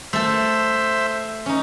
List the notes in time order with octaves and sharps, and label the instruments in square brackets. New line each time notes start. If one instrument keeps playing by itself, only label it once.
[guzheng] A3 A4 [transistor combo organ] C5 E5
[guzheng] C#4 D#4